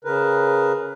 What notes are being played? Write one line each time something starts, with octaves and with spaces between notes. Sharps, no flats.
C#3 A#4 B4